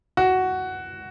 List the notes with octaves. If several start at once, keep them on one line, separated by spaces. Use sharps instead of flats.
F#4